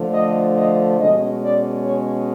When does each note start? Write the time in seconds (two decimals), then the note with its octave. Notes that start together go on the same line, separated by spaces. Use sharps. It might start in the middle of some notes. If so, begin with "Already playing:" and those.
Already playing: D3 F3 A3
0.14 D#5
0.56 D#5
0.99 B2 G#3 C#4 D#5
1.42 D5
1.84 C#5